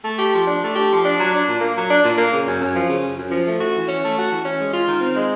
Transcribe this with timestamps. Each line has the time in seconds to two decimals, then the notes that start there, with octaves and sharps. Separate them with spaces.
0.05 A3
0.18 G4
0.33 F3
0.47 D4
0.62 A3
0.76 G4
0.90 F3
1.04 D4
1.19 F#3
1.32 D4
1.46 A#2
1.61 A#3
1.75 F#3
1.89 D4
2.03 A#2
2.18 A#3
2.32 C#3
2.46 F#2
2.60 F#2
2.74 F3
2.88 C#3
3.03 F#2
3.17 F#2
3.31 F3
3.45 A3
3.60 F#4
3.74 E3
3.87 C#4
4.02 A3
4.16 F#4
4.30 E3
4.44 C#4
4.59 G#3
4.72 F4
4.87 D#3
5.01 C4
5.15 G#3